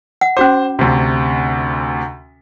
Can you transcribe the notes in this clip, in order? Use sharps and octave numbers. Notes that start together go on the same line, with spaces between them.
F#5
C#4 F#4 C5 D6
D2 C3